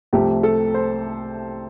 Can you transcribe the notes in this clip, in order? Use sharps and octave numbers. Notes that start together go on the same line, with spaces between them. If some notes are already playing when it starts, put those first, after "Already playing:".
C2 C3 F3 A3 C4 G4
A4
C5